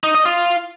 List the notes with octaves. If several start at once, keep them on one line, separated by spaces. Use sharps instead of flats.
D#4
D#5
F4